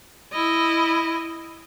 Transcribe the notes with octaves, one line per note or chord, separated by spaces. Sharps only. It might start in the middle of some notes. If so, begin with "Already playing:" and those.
E4 D#5